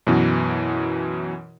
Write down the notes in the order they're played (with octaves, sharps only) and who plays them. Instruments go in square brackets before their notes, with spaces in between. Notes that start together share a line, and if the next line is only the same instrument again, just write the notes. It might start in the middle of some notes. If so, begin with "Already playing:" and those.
[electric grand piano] F#2 B2 E3